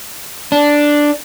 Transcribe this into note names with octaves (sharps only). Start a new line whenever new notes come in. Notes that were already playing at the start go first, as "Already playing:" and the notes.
D4